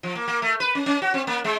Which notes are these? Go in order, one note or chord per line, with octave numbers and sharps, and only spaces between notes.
F3
A#3
A#3
A3
B4
C#4
C#4
F#4
C4
A#3
G#3